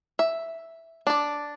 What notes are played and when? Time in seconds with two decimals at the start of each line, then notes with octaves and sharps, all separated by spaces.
0.19 E5
1.07 D4 D5